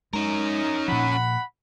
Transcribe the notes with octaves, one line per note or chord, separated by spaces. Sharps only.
G#3 C#4 D#4 A#4
A#2 F3 F#5 B5